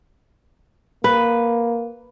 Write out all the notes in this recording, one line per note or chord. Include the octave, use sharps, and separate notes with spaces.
A#3 B4